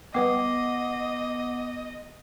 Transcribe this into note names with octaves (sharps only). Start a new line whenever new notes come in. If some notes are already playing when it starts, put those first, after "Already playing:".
G3 B3 B4 D#5 G5 D6 C7